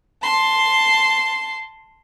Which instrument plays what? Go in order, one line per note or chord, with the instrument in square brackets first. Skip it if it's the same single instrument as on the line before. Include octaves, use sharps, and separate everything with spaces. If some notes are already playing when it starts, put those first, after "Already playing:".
[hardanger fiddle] A5 C6